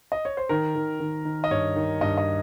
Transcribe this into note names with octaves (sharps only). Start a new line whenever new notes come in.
D#5
C#5
C5
D#3 A#4
D#3
D#3
D#3
D#5
G2 C#5
D#3
G2 D#5
D#5